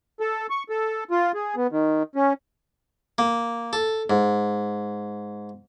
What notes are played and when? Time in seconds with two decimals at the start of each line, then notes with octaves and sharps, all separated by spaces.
0.20 A4
0.50 C#6
0.69 A4
1.11 F4
1.35 G#4
1.56 B3
1.71 D#3
2.16 C#4
3.18 A#3
3.73 A4
4.10 G#2